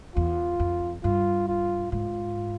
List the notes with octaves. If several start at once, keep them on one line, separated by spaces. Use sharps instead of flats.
E2 F4
F2
G2 F4
F4
G#2 F4